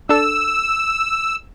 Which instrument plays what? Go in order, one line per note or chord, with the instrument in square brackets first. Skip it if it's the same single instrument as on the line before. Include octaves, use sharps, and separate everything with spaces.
[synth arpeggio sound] D4 A4 [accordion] E6